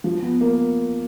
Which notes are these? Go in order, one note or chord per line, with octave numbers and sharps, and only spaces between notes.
F3
B3
A#3